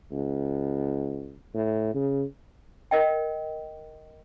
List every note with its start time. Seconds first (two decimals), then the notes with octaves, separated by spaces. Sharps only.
0.12 C#2
1.54 A2
1.94 C#3
2.91 A#4 D#5 G5